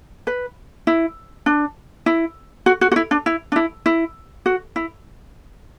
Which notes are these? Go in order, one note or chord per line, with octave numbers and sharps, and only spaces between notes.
B4
E4
D4
E4
F#4
F#4
F#4
E4
D4
E4
D4
E4
E4
F#4
E4